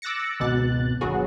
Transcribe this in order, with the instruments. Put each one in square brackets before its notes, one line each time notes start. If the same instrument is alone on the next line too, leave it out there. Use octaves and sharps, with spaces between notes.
[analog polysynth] D6 E6 F#6 A6 A#6 C#7
G#1 C#2 B2 F#6 A6
G1 D#2 F#3 B3 F#4 G#4